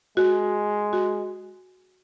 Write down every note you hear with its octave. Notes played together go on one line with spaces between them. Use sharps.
G#3 F#4
F#4